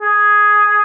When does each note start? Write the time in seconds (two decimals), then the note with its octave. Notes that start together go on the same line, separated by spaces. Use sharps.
0.01 G#4